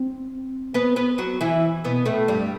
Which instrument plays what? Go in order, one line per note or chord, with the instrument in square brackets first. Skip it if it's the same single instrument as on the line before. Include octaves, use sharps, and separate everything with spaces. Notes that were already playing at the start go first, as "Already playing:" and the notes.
Already playing: [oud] C4
B3 B4
B3 B4
F#3 F#4
E3 E4
B2 B3
A2 A3
G2 G3